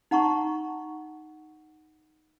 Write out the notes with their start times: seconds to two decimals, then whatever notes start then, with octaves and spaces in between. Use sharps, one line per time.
0.11 D#4 F#5 A#5 C#6